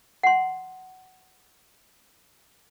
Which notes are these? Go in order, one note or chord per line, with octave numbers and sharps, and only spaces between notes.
F#5 C6